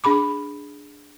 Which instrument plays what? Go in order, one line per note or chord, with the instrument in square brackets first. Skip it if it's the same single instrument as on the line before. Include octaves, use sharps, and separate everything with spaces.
[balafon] D4 G#4 B5 D6